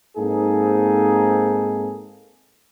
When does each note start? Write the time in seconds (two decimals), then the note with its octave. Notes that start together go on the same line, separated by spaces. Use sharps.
0.17 G#2 A#3 C4 D#4 G#4 A4